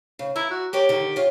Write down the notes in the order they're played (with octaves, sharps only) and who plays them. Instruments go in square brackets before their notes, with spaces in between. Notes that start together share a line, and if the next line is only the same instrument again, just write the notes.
[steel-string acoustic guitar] C#3
[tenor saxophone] E4 [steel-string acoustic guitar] A#5
[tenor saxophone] F#4
[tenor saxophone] G4 [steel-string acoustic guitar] A#4 C#5 D5
[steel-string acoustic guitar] D3 D#3
F4 C#5